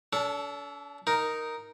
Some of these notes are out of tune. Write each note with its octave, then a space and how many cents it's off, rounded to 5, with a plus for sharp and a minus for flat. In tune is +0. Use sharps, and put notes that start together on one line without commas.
D4 -45 A4 +0
D#4 +0 A#4 +0